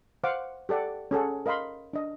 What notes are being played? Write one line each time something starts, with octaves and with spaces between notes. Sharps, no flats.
C5 F5 F#5 D6
G4 A4 D5 F#5
C#4 G#4 A4 F#5
A#4 D#5 F5 B5 C6
D4 D#5